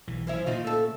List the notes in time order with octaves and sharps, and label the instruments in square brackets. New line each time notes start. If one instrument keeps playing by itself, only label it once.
[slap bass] B1 E3
[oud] F3 C#4 E4
[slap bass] A#2 C#3 [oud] D#4 F4
[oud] A3 A4